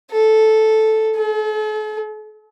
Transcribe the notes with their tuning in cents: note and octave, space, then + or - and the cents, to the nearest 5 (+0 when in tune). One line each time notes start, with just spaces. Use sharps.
A4 -5
A4 -45